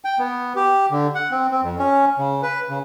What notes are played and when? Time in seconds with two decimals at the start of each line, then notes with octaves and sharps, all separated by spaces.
0.04 G5
0.19 B3
0.56 G4
0.91 D3
1.15 F#5
1.31 C4
1.51 C4
1.63 F2
1.79 C#4
2.18 C#3
2.43 B4
2.69 C#3